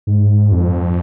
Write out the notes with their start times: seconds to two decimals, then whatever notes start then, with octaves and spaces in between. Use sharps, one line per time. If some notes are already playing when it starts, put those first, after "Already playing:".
0.07 G#2
0.52 F2